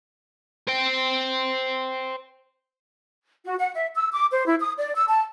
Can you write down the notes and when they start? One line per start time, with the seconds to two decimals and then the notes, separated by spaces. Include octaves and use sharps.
0.68 C5 G5
3.46 F#4
3.59 F#5
3.74 E5
3.96 E6
4.12 D6
4.32 C5
4.47 E4
4.61 D#6
4.77 D5
4.96 E6
5.09 A5